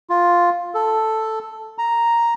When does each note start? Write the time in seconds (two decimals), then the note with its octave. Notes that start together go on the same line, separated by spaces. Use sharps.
0.10 F4
0.74 A4
1.78 A#5